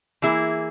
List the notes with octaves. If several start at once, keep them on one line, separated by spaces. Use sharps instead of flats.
E3 A#3 E4 G#4